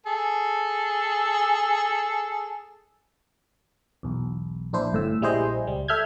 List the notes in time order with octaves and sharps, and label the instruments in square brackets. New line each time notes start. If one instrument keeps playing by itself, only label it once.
[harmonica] G#4 A4
[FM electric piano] B1 E2
A#1 D4 E4 C5
G1 A2 E6
A#1 G3 E4 G#4 C5 D#5
C#2 G3
A4 E5 F6 G6 G#6